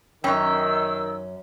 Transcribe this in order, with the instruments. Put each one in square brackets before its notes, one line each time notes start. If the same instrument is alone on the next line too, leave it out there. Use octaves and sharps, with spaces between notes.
[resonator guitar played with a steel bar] F#2 C#4 [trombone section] D#3 [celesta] G5 [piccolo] E6